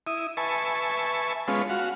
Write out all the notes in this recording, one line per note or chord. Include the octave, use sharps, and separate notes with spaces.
E4 D#6
B4 E5 G#5 A5 C#6
G#3 B3 C#4 F4
F#4 F5